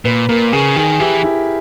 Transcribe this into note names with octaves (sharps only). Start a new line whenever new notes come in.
A#2 B4
A#2 A#4
C#3 G#4
D#3 G#4
E3 G4
E4